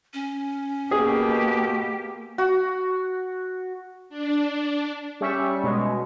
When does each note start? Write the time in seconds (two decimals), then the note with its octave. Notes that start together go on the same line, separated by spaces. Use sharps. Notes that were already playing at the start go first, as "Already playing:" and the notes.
0.14 C#4
0.91 B2 A#3 G4 G#4
2.38 F#4
4.09 D4
5.21 G3 C#4 E5 C#6
5.64 B2 G#3